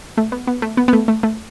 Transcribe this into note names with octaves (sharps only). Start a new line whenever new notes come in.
A3
B3
B3
A3
B3
B3
A3
A3
A3